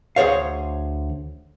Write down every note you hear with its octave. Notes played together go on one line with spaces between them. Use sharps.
D2 G#4 C5 C#5 F5